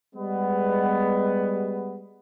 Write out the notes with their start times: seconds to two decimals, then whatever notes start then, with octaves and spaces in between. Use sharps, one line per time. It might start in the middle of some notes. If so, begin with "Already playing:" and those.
0.15 G3 G#3 B3